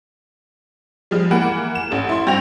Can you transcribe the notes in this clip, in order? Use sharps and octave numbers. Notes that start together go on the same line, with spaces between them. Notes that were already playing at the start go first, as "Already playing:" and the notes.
F3 G3 G#3
E3 A#3 F#5 B5 D7
E7
A1 A4
E4 C6
G2 C4 F#4 G5 A#6 F7